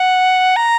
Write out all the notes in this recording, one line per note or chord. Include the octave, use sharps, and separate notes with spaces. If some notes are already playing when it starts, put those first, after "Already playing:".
Already playing: F#5
A#5